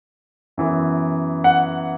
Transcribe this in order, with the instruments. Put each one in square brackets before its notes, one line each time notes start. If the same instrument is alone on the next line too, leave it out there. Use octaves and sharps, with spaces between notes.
[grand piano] F#2 E3 B3
F#5